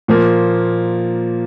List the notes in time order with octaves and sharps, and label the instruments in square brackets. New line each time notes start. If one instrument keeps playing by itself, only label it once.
[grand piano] A#2 F3 A#3